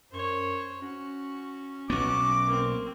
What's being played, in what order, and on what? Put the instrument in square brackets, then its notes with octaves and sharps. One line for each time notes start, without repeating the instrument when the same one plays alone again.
[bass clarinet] F#2 [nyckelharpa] C5 C#5
[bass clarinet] C#4 [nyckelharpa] F#4
[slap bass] B1 B3 [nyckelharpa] F#4 [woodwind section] D6
[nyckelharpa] A#3 C4